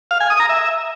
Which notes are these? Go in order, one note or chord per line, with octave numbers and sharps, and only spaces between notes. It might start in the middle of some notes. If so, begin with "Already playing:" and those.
F5
G#5
D#6
A#5
E5